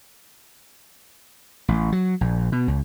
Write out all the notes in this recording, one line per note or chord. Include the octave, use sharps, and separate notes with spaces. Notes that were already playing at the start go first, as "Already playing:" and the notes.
A1
F#3
A#1
B2
C#2